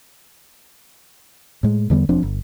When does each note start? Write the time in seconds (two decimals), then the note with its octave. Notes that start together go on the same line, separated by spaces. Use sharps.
1.63 A2 G#3
1.90 E2 D3 G3 B3
2.09 E1 F3 C4 D4
2.23 G1